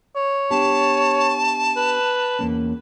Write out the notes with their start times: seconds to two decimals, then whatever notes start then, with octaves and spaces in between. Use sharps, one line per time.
0.16 C#5
0.51 B3 D4 G4 A5
1.77 B4
2.39 E2 A#3 C#4